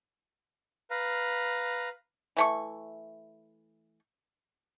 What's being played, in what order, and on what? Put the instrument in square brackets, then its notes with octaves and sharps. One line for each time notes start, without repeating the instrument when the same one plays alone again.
[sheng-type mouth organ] B4 F5 A#5
[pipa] E3 A3 C#6